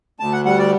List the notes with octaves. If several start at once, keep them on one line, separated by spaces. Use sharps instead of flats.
D2 A5
F#5
G3 F#5
D5